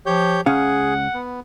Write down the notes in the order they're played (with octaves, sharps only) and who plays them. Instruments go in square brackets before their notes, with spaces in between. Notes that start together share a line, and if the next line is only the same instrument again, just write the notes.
[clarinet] F3 [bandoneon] G4 C#5 G6
[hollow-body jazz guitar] C#2 C#4 F5 [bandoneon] G#4 [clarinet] F#5
[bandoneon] B3